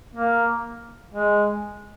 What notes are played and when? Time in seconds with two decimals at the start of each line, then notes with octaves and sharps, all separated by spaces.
0.15 A#3
1.14 G#3